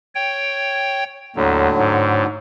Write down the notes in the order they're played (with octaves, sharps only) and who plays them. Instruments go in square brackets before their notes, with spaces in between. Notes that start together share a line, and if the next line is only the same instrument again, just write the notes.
[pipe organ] C#5 G5
[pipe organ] D#2 [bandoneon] A2 D3 F#3
[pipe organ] G#2